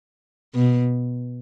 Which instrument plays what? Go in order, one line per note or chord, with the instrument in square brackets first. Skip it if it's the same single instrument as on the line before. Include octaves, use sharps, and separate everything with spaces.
[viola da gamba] B2